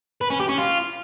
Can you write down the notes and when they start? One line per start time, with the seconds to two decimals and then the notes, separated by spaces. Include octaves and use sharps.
0.21 B4
0.30 C#4
0.40 G4
0.49 C#4
0.58 F4